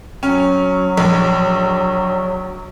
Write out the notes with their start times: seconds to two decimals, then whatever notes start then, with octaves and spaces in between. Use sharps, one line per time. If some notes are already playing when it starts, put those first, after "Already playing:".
0.23 F#3 C#4
0.97 A#1